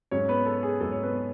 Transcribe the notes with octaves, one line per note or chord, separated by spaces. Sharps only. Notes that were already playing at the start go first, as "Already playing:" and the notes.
G#2 F#3 C#4 C#5
B3 B4
A4
G#4
G#2 F#3 A4
C#5
B3 B4